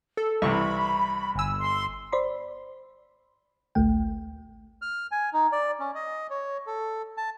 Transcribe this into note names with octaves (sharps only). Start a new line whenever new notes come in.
A4
C2 C3 E3 B5 C#6
G1 G#5 E6
C6
C5 D5 B5 C6
A1 D2 A3 G5
F6
G#5
D#4
D5
C#4
D#5
C#5
A4
A5